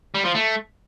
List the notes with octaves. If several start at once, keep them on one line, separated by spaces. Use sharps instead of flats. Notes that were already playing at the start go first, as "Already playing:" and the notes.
G3
F3
A3